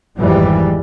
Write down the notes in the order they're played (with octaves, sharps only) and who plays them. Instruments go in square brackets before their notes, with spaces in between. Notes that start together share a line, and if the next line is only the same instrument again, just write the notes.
[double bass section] G#1 F2 E3 G3